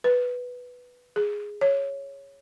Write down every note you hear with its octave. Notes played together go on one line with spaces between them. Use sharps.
B4
G#4
C#5